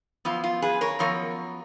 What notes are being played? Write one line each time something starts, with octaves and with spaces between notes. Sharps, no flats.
F#2 F3 B3 F4
F4
G#4 B4
A#4 C#5
F#2 F3 B3 A#4 C#5